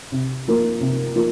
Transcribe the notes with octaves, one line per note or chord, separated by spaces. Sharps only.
C3
F3 A#3 F4
C3
F3 A#3 F4